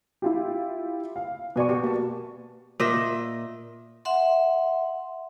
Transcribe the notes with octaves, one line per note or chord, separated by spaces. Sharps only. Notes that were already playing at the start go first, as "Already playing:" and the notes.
E4 F4 G4
F5
B2 B3 F#4 D5 G#5 C#6
B3 F#4 G4
A#3 A5
A#2 D#5 E5
E5 F#5 C6